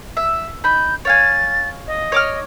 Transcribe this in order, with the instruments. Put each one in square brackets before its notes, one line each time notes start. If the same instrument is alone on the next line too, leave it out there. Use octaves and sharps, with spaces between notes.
[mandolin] E5
[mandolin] D#4 B5 [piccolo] G6
[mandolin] C#5 F5 G#5 [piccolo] A6
[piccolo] D#5
[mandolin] C#5 D6 F6